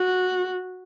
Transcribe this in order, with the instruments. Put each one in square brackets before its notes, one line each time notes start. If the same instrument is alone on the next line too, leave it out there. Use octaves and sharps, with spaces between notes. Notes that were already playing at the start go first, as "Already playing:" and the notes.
Already playing: [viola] F#4